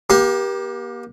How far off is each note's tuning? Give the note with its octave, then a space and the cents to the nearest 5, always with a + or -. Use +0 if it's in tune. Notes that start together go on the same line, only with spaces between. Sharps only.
A#3 +35 G4 +0